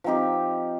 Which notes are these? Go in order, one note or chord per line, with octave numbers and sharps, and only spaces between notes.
F3 C4 D#4 G4